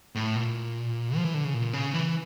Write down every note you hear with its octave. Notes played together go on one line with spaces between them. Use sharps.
A2
A#2
F3
E3
D3
C#3
A#2
C#3
E3